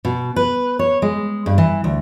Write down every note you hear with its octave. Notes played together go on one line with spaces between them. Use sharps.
B2
B4
C#5
G#3
G2
E3
D2